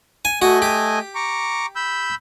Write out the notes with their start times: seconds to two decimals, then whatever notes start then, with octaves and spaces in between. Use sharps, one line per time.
0.25 G#5
0.42 A3 F#4 D#5 G#5
0.62 G4
1.15 A#5 C#6 D6
1.76 B5 E6 G6